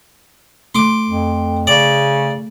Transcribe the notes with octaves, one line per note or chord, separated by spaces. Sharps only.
A3 C6 D6
F2
C#3 D5